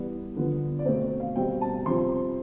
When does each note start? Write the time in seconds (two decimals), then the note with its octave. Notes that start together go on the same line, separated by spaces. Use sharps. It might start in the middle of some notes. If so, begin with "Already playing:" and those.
Already playing: E3 G3 B3 D5
0.36 D3 F3 B3
0.79 D5
0.85 B2 A3 C4 C5
1.20 F5
1.36 B2 G3 C4 G5
1.61 A5
1.86 C3 F3 C4 C6